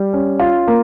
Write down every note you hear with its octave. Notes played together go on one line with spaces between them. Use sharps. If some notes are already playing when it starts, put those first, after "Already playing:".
Already playing: G3
C#4
F4
A#3